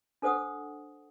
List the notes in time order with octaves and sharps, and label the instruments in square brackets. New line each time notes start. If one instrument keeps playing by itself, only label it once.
[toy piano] D4 A4 C5 F#5 D#6